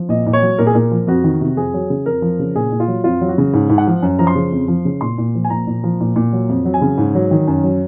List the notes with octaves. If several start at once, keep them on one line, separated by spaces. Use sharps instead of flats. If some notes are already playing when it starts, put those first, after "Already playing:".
Already playing: F3
A#2 D#5
A#2
C#5
F#3
A#2 A#4
G#4
A#2 A#4
F3
F2 F#4
D#3
C3
F2 G#4
F#3
C#3
F2 A#4
F3
C#3
A#2 G#4
A#2
F4
F#3
F2 F4
F#3
F#4
C#3
G#2
G#2
F#5
F3
F#2
F3 A#5
C6
C#3
F2
F3
C#3
A#2 C6
A#2
F3
G#5
A#2 A#5
A#2
F3
A#2
A#2
F#3
F2
F#3
G#5
C#3
G#2
F#3
D#3
F#2
F#3